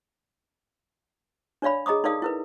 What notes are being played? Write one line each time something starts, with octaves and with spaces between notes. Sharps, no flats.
D4 C#5 D5 F5 B5
G#4 D#5 A#5 D6 D#6
D#4 A4 A#4 D5 F5 D#6
E4 A#4 B4